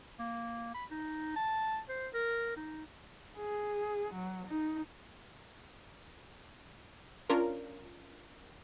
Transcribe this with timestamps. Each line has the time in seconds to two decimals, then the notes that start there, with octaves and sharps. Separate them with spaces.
0.19 A#3
0.74 B5
0.91 D#4
1.36 A5
1.89 C5
2.13 A#4
2.57 D#4
3.38 G#4
4.14 F#3
4.47 D#4
7.30 C#4 D4 F4 A#4